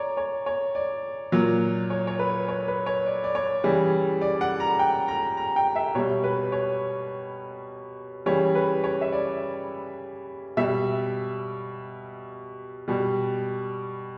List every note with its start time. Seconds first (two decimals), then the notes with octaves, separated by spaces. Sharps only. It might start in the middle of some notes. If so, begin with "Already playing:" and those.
Already playing: C#5 D5 A#5
0.17 C#5
0.46 C#5
0.75 D5
1.32 A#2 F#3
1.90 C#5
2.07 C#5
2.19 B4
2.48 C#5
2.68 B4
2.86 C#5
3.06 D5
3.24 D5
3.35 C#5
3.64 C#3 E3 G3
4.21 D5
4.41 F#5
4.60 A#5
4.79 G5
5.08 A#5
5.37 A#5
5.56 G5
5.76 E5
5.95 B2 G3 C#5
6.24 B4
6.52 C#5
8.26 C#3 E3 G3 C#5
8.55 B4
8.84 C#5
9.01 E5
9.12 D5
10.57 B2 G3 E5
12.88 B2 G3